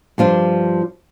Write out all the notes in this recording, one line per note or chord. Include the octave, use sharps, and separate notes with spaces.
G2 F3 D4 F4